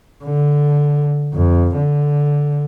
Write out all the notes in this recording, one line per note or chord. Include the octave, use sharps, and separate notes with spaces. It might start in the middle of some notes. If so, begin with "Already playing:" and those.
D3
F2
D3